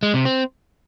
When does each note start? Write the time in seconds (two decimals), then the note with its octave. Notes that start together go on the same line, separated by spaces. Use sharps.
0.03 G#3
0.14 C3
0.25 C4